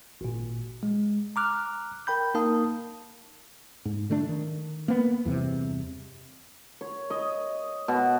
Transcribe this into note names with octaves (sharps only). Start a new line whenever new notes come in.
G#1 A#2
G#3
A#5 D6 F6 F#6
A#4 G5 B5 G6
A#3 D#4 A#4 F5 A5 D#6
G#2
D3 A3 D4
D#3
A#3 B3
E2 G2 C3
C#5
D#5
B2